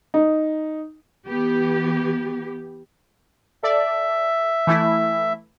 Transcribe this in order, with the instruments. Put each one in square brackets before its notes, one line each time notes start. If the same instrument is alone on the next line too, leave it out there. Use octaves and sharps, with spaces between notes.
[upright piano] D#4
[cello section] E3 B3 G4
[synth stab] A4 D5 [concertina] E5
[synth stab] E3 A3 E4